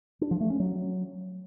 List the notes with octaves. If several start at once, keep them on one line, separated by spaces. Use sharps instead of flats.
D4
F3
A3
C#4
F#3